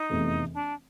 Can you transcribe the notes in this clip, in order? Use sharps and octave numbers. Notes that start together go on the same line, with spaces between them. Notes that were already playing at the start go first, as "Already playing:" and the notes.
Already playing: D#4
F1 E2 C3 E3 A3
D4